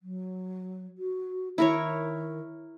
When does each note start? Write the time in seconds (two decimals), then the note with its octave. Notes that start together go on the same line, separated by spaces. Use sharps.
0.02 F#3
0.98 F#4
1.58 D#3 E4 A#4 C#5